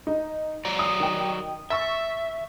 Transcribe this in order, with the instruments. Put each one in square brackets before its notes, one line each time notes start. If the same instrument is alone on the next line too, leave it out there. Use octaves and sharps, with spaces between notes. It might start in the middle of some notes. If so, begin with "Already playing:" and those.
[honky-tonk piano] D#4
[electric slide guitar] F#3 D5 A#5
[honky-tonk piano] D#6
D#3 G5
[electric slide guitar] E5 [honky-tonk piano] C#6 E6 A6